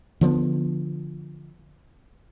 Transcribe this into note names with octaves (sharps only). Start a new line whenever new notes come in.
D3 F3 G3 B3